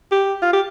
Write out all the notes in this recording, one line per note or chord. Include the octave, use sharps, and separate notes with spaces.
G4
F4
G4